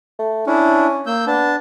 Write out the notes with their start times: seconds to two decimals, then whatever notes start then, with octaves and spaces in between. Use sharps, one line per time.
0.19 A3
0.47 C#4 D4 E4
1.07 A#3 E6 G6
1.27 B3 D4 A5